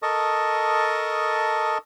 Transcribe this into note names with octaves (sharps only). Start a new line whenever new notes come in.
A4 A#4 D#5 A5 C#6 D#6